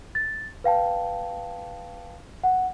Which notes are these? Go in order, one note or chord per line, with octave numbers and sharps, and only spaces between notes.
A6
B4 F5 G5 A5
F#5